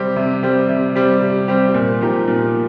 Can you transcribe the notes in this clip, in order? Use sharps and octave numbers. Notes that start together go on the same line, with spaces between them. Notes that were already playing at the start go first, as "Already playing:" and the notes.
Already playing: C3 G3 C4 G4
C3
G3 C4 G4
C3
G3 C4 G4
C3
G3 C4 G4
A#2
F3 D#4 G4
A#2